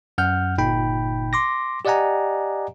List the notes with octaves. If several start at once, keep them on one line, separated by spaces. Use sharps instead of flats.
F#2 F#5 F6 G6
G1 A#2 D#4 G5 B5
C6 D6 A#6
G4 D5 D#5 F#5 G#5 A#5